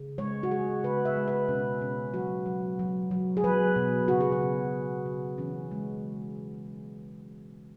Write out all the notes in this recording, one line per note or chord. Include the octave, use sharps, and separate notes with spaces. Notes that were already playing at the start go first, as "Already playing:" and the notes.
Already playing: C#3
G#3 C#5
F#4
G#3 G#4
C#3 B4
E5
G#3
B4
B2 C#4
B2 C#4
F#3 F#4
F#3
F#3
F#3
G#4
F#3 B4
B2
C#3 F#4
G#4
F#4
C#3
C#3
C#3
E3 C#4
G#3